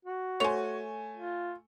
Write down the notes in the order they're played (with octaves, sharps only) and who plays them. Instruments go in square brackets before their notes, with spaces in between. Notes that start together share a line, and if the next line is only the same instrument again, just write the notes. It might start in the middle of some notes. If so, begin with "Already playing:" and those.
[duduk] F#4
[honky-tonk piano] A3 G#5 [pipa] C5 C#5
[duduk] F4